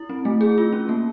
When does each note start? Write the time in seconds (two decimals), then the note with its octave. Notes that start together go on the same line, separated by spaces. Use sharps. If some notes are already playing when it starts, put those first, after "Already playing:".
Already playing: E4
0.09 C4
0.25 A3
0.41 G#4
0.58 F4
0.73 C#4
0.89 A#3